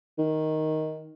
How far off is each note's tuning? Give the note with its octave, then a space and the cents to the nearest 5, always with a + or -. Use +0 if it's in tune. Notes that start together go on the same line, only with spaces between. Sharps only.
D#3 +5